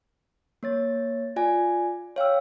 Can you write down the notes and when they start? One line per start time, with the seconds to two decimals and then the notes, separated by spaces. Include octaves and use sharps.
0.63 A#3 C#5 A6
1.36 F4 D5 G#5
2.16 C#5 F5 G5 E6